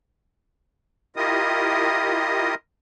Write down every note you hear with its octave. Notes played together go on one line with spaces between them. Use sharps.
E4 F4 G4 A#4 D#5 D#6